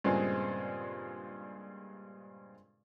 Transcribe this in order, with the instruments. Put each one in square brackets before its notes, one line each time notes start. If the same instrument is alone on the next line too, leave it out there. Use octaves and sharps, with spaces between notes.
[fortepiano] G2 A#2 C#3 G#3 C4